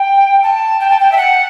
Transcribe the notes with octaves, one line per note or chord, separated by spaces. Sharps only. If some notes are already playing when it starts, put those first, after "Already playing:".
Already playing: G5
A5
G5
A5
G5
E5
F#5